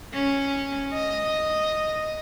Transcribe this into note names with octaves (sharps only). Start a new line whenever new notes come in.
C#4
D#5